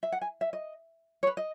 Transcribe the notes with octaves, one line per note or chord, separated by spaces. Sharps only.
E5
F#5
G#5
E5
D#5
C#5
B4
D#5